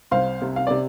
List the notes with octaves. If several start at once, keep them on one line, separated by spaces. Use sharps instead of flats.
C2 C5 F5
C3
F5
C3 D5